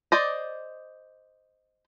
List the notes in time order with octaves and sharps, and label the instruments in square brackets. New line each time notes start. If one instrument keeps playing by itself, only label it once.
[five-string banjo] C5 D5 D#5